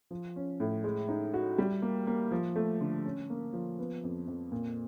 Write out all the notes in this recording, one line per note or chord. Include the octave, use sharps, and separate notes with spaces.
F3
C#4
A2
G#3
D#4
F#4
G3
A#3
A#3
F3
A3
D3
C#4
A#3
F3
B3
F2
F2
A#2